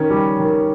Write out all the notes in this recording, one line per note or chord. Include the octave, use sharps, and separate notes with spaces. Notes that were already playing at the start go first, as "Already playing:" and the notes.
Already playing: D#3 C#4
G3
D#3